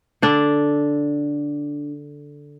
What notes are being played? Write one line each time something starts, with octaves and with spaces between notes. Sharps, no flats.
D3 D4